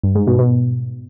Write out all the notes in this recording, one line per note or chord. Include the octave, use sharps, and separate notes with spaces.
G2
G#2
B2
B2